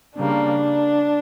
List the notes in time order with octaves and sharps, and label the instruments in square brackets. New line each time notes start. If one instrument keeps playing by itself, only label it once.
[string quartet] C#3 G3 A#3 D4